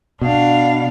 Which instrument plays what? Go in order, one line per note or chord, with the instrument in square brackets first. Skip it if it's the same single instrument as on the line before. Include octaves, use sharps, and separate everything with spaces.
[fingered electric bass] B2 [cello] D4 F5